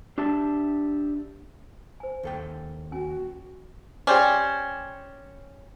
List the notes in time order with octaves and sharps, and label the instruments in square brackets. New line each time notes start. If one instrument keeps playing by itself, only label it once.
[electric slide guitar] D4 G4 E5 A5
[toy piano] C5 G#5
[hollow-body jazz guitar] D#2 A4 G5
[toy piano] C#4 G#5 [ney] F#4
[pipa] C#4 [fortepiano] G4 C5 D5